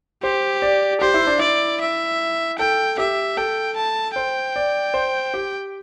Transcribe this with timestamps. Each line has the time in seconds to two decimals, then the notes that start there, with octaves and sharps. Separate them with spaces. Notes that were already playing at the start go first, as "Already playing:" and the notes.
0.23 G4 C5
0.62 D5
1.01 G4 C5
1.14 E4
1.27 D4
1.38 E4 D5
1.81 E5
2.59 A4 G5
2.98 G4 E5
3.37 A4 G5
3.76 A5
4.15 C5 G5
4.56 D5
4.94 C5
5.34 G4